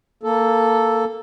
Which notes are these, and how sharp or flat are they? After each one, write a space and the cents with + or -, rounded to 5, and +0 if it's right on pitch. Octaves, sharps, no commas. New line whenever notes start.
A#3 -10 A4 +0